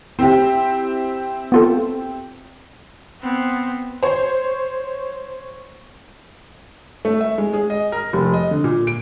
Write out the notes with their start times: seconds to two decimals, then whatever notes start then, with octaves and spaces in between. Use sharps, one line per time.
0.19 C4 E4 G4
1.52 B3 F4 A4
3.22 B3 C4
4.03 C5 C#5
7.05 A3
7.21 E5
7.38 G#3
7.53 G#4
7.70 D#5
7.92 A#4
8.13 F1
8.34 D#5
8.51 D3
8.64 A#2
8.87 D7